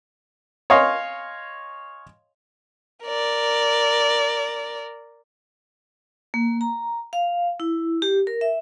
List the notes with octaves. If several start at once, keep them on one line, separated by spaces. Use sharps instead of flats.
C#5 D#5 F5 G#5 C6
A#4 D5
A#3
A#5
F5
E4
G4
A#4
E5